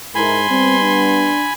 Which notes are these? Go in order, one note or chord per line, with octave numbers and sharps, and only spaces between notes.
G#2 E4 A#4 G#5 B5 C6
G3 B3 C4
D4